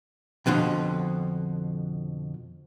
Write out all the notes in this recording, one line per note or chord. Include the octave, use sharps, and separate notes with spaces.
F2 B2 D3 F3